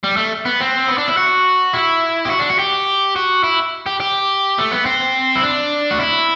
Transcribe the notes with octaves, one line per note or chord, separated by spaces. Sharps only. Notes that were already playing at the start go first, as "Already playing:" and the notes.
G3
A3
B3
C4
B3
D4
E4
F#4
E4
G4
F#4
D4
F#4
G4
F#4
E4
G4
G4
A3
B3
C4
E4
D4
F#4
E4